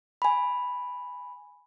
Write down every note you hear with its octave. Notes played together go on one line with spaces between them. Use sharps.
G#5 B5